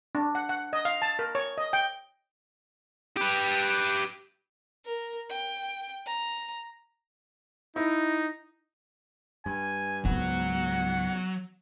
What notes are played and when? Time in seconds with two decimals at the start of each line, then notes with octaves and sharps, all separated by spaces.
0.15 D4
0.35 F#5
0.49 F#5
0.73 D#5
0.85 F5
1.02 A5
1.19 A#4
1.35 C#5
1.58 D#5
1.73 G5
3.17 G4 B4
4.85 A#4
5.30 G5
6.06 A#5
7.76 D#4 E4
9.46 G2 G#5
10.05 C#2 G#2 F#3 B3 F#5